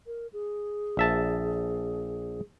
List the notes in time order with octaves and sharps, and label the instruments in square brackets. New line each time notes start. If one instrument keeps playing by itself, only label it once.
[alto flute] A#4
G#4
[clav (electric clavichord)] A#1 E5 A5